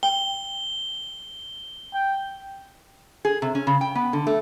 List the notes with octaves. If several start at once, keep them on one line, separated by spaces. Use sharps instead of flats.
G5 G7
G5
G#4
C3
C#4
C#3
G5
B3
D3
A3